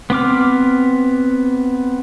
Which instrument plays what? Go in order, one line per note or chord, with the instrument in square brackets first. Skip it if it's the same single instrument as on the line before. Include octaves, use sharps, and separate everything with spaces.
[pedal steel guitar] B3 C4 D6 F6